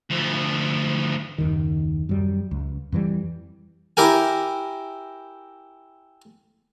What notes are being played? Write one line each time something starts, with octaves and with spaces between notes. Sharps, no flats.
D2 F3
F#1 D#2 D#3
F#2 G3
C#2
F2 E3 G3
E4 G4 A#4 G#5